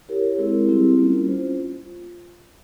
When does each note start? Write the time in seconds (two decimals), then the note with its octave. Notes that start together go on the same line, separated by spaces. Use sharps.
0.08 E4 G4 A#4 C#5
0.38 G#3 C4 E4 G#4
0.68 G3 C4 E4 G4 A#4
0.97 G3 A#3 C#4 F4
1.28 C#4 F4 C5